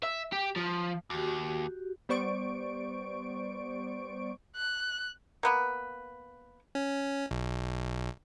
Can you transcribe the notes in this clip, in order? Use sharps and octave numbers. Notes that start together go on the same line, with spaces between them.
E5
G4
F3
D#2 F#4 G4
G3 B3 C5 D5 C#6 D7
F#6
A#3 B3 B4
C#4
B1